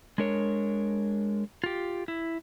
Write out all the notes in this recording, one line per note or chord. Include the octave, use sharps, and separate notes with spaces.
G#3 D4 A#4 C#5
F4 G4
E4